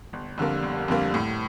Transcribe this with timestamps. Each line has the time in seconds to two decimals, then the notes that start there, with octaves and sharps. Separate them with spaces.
0.13 G1
0.38 F2 D3 G3 A#3
0.63 G1
0.88 F2 D3 G3 A#3
1.14 A2